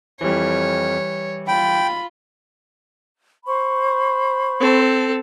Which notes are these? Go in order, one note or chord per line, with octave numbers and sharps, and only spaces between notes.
F2 E3 G3 C#5
F4 G5 B5
C5 B5 C#6
C4 A4